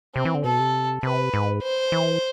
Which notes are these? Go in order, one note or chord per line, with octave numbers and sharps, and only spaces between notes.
C3 C4
E3
D3
B2 A4
C3
C3 B4
G#2
C5
E3